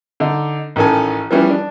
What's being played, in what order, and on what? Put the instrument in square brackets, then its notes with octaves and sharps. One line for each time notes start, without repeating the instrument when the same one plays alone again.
[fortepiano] D3 D#4
A1 D#3 C#4 A4 G#5
E3 F3 G3 B3 C#4 E4
D4